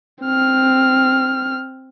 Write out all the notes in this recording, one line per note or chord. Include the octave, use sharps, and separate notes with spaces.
C4 F6